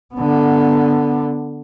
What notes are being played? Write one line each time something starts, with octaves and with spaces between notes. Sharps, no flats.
D3 B3